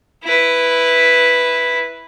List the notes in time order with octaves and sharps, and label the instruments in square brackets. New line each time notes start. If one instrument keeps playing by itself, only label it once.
[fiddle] E4 B4